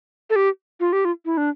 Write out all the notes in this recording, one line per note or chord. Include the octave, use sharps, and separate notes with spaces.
A4
G4
F4
G4
F4
E4
D4